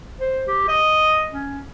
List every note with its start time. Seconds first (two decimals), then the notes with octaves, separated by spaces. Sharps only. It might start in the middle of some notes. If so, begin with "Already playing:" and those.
0.21 C5
0.48 G4
0.69 D#5
1.34 C#4